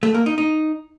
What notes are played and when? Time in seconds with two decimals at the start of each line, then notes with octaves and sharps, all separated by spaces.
0.03 A3
0.14 A#3
0.26 D#4
0.38 D#4